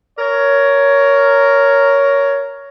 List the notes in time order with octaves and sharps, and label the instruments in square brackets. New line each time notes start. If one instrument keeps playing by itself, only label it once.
[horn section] A#4 C#5